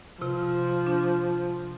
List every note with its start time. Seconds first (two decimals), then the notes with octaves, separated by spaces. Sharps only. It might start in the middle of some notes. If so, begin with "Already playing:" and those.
0.21 C3 F3 F4
0.87 D4